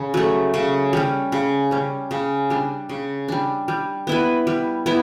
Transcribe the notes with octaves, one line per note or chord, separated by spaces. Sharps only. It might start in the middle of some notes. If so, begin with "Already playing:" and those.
Already playing: C#3
F#3 A3
C#3
G3 C#4
C#3
G3 C#4
C#3
G3 D4
C#3
G3 D4
G3
B3 E4 B4
G3
B3 E4